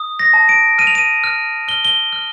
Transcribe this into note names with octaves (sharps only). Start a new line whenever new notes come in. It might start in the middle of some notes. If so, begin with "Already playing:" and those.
Already playing: D#6
A#6
A5
D7
F6 D#7
F7
D#7
F6
F6 G7
G7
F6